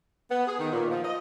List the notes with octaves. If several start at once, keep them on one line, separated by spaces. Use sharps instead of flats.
B3
G#4
D#3
A#2
F3
D#5